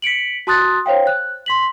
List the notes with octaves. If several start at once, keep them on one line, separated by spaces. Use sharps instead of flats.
B6 C#7 D7 F#7
F#4 A5 C6 D#6 F#6 A6
C5 C#5 F5 G5
F#6
C6 B6 F#7